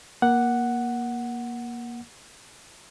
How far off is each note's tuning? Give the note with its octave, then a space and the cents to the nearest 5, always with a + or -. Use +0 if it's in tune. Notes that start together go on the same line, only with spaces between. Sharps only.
A#3 +20 F#5 +0